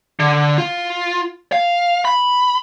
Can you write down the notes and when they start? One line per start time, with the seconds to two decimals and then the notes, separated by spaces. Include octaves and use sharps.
0.20 D3
0.58 F4
1.52 F5
2.05 B5